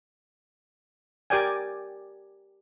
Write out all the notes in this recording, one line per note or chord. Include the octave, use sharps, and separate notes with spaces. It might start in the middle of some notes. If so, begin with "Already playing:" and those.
G4 A#4 D5 G5 G#5